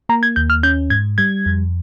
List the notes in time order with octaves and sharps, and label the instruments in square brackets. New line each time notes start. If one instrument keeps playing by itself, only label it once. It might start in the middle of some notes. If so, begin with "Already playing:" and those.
[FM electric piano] A#3 A#5
G#6
D#2 G6
F6
C#4 G6
G#2 G#6
G3 G#6
F2